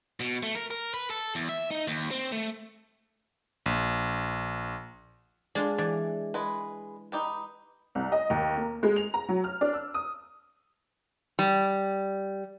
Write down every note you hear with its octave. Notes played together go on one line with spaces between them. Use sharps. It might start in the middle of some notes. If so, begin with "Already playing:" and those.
B2
A3
A#4
A#4
B4
A4
E2
E5
D#4
D#2
C4
A3
A#1
G#3 D4 F4 D5
E3 D5
G#3 B4
D#4 G4 B4
C2
D#5
D#2
A#3
G#3
F7
A#5
F#3
F6
D4
E6
D#6
G3